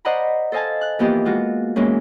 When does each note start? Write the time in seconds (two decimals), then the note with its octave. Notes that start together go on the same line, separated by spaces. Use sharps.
0.05 C5 D5 D#5 F#5 A#5 B5
0.52 A4 C5 D#5 F5 G#5 A5
0.81 F#6
0.99 E3 F3 A#3 B3 G4 D#5
1.25 G#3 F4 F#4
1.76 E3 G#3 A#3 C#4